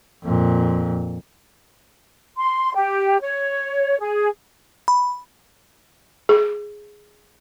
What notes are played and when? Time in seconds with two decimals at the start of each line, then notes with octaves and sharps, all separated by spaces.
0.23 F2 A#2
2.36 C6
2.74 G4
3.21 C#5
3.99 G#4
4.88 B5
6.29 G#4